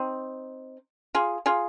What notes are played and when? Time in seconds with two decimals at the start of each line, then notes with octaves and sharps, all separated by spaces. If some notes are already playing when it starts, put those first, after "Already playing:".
Already playing: C4 D#4
1.15 F4 G#4
1.46 F4 G#4